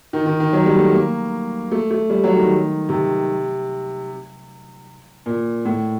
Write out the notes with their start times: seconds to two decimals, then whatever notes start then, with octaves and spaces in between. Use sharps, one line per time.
0.13 D#3
0.26 D#3
0.40 D#3
0.53 F#3
0.66 G3
0.78 A3
0.92 A#3
1.72 A3
1.91 A3
2.10 G3
2.24 F#3
2.36 D#3
2.89 C3
5.26 A#2
5.65 A2